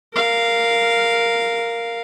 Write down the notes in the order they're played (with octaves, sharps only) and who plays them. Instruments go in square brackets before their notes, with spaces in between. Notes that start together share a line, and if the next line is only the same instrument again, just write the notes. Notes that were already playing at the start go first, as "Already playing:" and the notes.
[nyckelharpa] A#4 F5